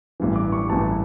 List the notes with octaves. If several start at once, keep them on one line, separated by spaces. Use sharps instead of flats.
A1 G2 E3
D6
C#6
A1 G2 E3 A5